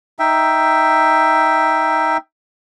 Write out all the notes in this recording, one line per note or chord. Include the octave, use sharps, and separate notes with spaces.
D#4 E5 G5